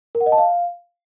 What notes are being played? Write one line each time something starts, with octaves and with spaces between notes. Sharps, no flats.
A#4
F#5
D#5
A5
F5